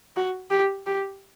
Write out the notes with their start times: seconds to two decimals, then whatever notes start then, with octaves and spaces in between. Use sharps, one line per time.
0.16 F#4
0.50 G4
0.86 G4